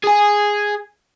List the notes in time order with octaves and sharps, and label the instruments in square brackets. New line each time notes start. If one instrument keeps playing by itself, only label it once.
[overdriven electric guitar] G#4 G#5